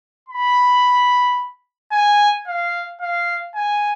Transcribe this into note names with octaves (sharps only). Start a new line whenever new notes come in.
B5
G#5
F5
F5
G#5